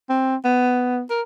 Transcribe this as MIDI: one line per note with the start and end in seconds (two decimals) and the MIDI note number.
0.10 0.36 60
0.45 1.02 59
1.10 1.22 70